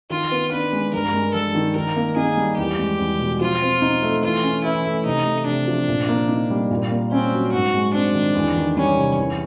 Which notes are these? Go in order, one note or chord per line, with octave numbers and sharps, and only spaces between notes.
D#3 F4
B3
D4 B4
G#3
G2 A#4
G#3
G2 A4
D#3
D#3 A#4
A#3
D#4 G#4
G3
E2 G4
G#3
E2
B2
F3 F4
C4
D#4
A3
E3 F4
C#4
E3 E4
A3
C3 D#4
A3
C3 D4
F3
A#2
A#3
D#4
G3
A#2
A#3
C4 C#4
F#3
G#2 F#4
G#3
C4 D4
D#3
E2
D#3
G3 C#4
C3
E2